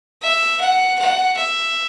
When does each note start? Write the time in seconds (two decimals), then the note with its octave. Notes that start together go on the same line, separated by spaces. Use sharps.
0.23 E5
0.61 F#5
0.99 F#5
1.37 E5